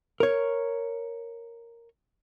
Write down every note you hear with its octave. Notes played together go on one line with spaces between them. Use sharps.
A#4 C#5